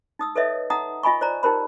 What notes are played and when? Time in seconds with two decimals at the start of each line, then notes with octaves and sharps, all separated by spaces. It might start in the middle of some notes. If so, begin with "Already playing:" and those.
0.19 D#4 D#6 E6
0.36 A4 B4 C#5 D#5 E5
0.70 D#4 F#5 A#5 D#6
1.03 F4 D#5 G#5 B5 C#6
1.21 C5 D5 A#5
1.43 D#4 G4 A#4 C5 B5